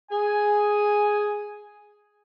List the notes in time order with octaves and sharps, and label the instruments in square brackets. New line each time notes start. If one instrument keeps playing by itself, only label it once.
[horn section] G#4 G#5